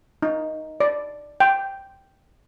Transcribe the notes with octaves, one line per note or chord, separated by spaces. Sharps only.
D#4
D5
G5